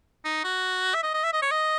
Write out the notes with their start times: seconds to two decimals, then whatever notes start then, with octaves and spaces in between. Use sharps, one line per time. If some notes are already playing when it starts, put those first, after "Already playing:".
0.25 D#4
0.44 F#4
0.94 E5
1.03 D#5
1.14 D#5
1.23 E5
1.33 D#5
1.42 C#5
1.51 D#5